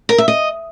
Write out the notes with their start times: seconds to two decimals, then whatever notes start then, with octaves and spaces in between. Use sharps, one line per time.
0.09 A#4
0.18 E5
0.28 D#5